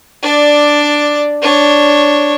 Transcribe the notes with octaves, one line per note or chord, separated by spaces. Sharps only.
D4 D5
D4 C#5